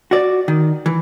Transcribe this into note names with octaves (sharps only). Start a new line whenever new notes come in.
F#4 D5
D#3
E3